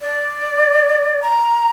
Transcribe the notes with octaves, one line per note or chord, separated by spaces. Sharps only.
D5
A#5